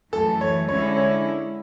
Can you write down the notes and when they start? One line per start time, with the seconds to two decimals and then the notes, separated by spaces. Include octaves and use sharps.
0.13 F#2 E3 A3 A4
0.41 C#5
0.69 D3 G#3 C#4 E4 C#5
0.97 C#5